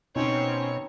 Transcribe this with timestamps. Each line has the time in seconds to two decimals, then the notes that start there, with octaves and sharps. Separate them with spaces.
0.16 B2 C4 C#4 D#4 C#5